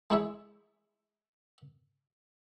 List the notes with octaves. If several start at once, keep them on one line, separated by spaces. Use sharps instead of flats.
G#3 D#4 E4 G#4 C#5 E5